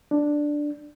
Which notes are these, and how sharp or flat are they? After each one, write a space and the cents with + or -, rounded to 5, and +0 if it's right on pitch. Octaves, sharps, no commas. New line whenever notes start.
D4 +5